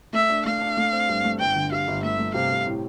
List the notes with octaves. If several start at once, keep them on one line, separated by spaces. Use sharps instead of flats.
A3 E5
D4
A3 F5
D4
A3
C4
G2
A3
G1 G5
D3
G3 F5
G1
A3 E5
A3
C3 F5
C3
A2